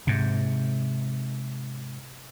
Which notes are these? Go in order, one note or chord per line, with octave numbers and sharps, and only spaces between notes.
G#2 C3